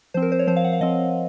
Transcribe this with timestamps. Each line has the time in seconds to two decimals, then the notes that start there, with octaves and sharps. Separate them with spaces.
0.14 F3 C4 C5
0.22 A#4
0.32 C5
0.39 C#5
0.47 F3 C4 C5
0.56 F5
0.64 F#5
0.73 F5
0.81 F3 C4 D#5